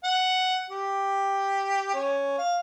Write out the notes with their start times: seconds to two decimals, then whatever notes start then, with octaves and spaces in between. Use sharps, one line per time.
0.04 F#5
0.70 G4
1.94 C#4
2.38 F5